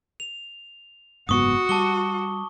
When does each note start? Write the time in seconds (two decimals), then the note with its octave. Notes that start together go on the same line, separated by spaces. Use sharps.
0.20 F7
1.29 F#1 G#2 B3 F#4 C#6 D#6
1.69 G3 A5 D6 G7